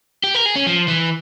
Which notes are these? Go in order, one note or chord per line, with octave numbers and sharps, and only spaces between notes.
G4
A#4
G#4
C#4
F3
E3